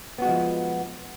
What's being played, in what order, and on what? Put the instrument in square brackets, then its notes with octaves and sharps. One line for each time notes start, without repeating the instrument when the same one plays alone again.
[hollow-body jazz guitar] B3
F#4
G#3
F3